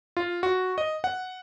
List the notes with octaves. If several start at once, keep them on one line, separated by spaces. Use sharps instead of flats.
F4
F#4
D#5
F#5